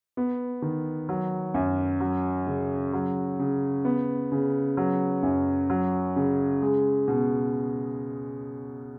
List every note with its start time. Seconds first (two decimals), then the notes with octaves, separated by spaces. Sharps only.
0.17 B3
0.62 D#3
1.09 F#3
1.54 F#2
2.00 F#3
2.47 C#3
2.93 F#3
3.39 C#3
3.85 B3
4.32 C#3
4.77 F#3
5.23 F#2
5.70 F#3
6.16 C#3
6.62 G#3
7.08 B2